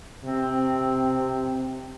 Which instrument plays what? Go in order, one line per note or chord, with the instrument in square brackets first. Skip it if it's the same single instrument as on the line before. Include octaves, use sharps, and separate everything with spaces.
[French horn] C3 [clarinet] C4